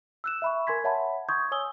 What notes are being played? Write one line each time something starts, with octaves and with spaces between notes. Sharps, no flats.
E6 F#6 E7
E5 B5 C#6
A#4 G#5 C6 G#6 B6
C#5 E5 F#5 A5 B5
C6 C#6 D#6 G6 G#6
C#5 G#5 D#6 E6 G7